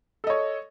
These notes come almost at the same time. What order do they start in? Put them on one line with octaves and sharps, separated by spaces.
A4 D#5 C#5